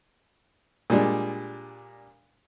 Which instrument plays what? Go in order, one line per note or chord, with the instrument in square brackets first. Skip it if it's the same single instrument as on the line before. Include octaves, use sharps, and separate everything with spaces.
[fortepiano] A#2 G3 G#3 D4